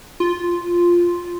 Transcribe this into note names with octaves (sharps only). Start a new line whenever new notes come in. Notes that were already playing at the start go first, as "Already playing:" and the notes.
F4